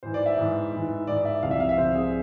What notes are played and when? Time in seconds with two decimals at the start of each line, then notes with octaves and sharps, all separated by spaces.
0.03 G#2 E3 C5
0.14 D5
0.26 E5
0.37 G#2 E3
0.72 G#2 E3
1.07 G#2 E3 D5
1.25 E5
1.42 C2 C3 F3 F5
1.51 E5
1.60 F5
1.69 E5
1.78 C2 C3 F3 C5
1.95 G#4